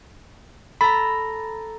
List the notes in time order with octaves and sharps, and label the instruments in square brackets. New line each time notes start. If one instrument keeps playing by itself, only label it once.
[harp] A4 A#5 [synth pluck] B5